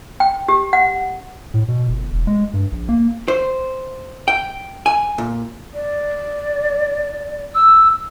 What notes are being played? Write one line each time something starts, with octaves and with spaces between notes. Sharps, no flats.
G5
G4
F#5
A2
B2
G1
E1
G#3
G2
A#1
A#3
C5
G5
G#5
A#2
D5
E6